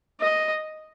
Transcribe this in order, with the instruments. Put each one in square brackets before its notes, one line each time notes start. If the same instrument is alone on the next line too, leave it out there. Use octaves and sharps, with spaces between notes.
[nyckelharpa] D#5